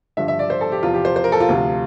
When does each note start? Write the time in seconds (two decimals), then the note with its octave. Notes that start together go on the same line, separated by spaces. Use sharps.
0.17 G2 D3 F3 E5
0.28 E5
0.39 D5
0.50 C5
0.61 A4
0.72 G4
0.83 E2 C3 F3 F4
0.94 G4
1.05 C5
1.16 C5
1.24 A#4
1.32 A4
1.40 F4
1.49 D2 C3 F3